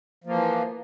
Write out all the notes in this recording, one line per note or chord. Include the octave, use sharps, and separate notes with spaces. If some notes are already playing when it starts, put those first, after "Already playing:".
E3 F3 A#3